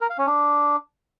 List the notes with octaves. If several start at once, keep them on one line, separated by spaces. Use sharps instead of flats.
A#4
F5
C#4
D4